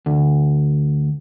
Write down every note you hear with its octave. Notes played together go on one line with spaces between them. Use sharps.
D2